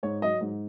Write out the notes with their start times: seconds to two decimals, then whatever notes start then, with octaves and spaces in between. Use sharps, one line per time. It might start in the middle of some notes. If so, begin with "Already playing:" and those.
0.03 G#2 C#5
0.22 F#3 D#5
0.41 G#2